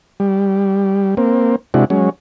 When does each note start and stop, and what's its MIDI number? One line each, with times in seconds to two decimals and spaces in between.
0.20 1.15 55
1.17 1.56 58
1.17 1.56 60
1.74 1.85 48
1.74 1.85 56
1.74 1.85 62
1.74 1.85 64
1.74 1.85 66
1.90 2.10 54
1.90 2.10 56
1.90 2.10 61